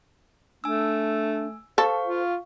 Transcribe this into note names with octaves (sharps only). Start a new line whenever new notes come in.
A3 D4 G#5 E6
A4 C5 F5 C#6
F4